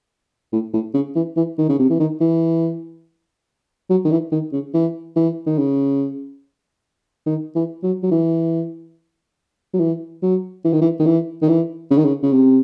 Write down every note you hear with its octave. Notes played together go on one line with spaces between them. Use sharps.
A2
A2
C#3
E3
E3
D#3
C#3
C3
E3
D#3
E3
F#3
D#3
E3
D#3
C#3
E3
E3
D#3
C#3
D#3
E3
F#3
F#3
E3
F#3
E3
F#3
E3
D#3
E3
D#3
E3
D#3
E3
C#3
D#3
C#3
C#3
C3